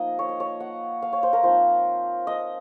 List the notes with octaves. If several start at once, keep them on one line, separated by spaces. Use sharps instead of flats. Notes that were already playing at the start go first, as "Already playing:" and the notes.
Already playing: F3 A#3 D#4 D#5
C#5
D#5
C#5
F#5
F5
C#5
C5
A#4
F3 C4 D#4 C5
D#5